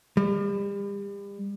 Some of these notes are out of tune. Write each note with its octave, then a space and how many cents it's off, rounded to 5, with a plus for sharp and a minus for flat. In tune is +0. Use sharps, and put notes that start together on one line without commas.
G3 +35